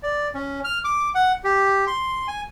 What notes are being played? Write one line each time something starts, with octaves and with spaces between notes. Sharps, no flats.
D5
C#4
F6
D6
F#5
G4
C6
G#5